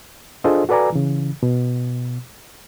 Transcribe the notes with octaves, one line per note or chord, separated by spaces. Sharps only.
D4 F4 G#4 A4 C5 D#5
F#4 A4 B4 D5 G#5 A#5
C#3 E3
B2